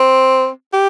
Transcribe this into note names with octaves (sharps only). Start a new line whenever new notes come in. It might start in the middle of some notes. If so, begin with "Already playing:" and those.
Already playing: C4
G4